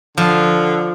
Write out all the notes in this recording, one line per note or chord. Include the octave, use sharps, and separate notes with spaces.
D3 F3